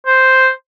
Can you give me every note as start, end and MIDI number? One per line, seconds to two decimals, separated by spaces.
0.06 0.50 72